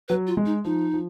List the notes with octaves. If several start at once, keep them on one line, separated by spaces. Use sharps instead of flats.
F#3 B4
F4
G#3
D#4
F3 D#4
F3